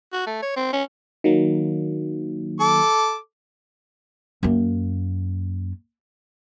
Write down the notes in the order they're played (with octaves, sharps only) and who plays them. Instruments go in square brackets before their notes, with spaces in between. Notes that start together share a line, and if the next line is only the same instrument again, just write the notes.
[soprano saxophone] F#4
A3
C#5
C4
C#4
[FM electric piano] D#3 F#3 A#3
[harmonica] A4 D6
[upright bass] F#2 A#3